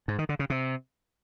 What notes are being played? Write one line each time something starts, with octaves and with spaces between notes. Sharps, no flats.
G#2
D#3
D3
C#3
C3